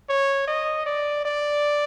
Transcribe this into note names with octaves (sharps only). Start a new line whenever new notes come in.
C#5
D#5
D5
D5